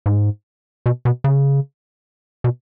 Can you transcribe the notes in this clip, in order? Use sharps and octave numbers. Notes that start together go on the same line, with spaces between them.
G#2
B2
B2
C#3
B2